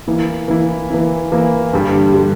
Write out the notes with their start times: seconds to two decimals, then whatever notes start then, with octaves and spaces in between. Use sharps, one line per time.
0.07 E3 A#3 E4
0.48 E3 A#3 E4
0.90 E3 A#3 E4
1.32 E3 A#3 E4
1.73 G2 D3 G3
2.14 D3 G3